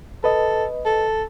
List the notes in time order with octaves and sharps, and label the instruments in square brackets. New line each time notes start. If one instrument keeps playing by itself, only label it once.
[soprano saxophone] A4 [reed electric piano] B4 D#5
[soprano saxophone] A4